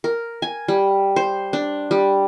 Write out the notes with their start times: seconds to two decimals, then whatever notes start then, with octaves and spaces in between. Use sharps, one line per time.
0.04 A#4
0.42 G#5
0.68 G3
1.16 C5
1.53 D4
1.91 G3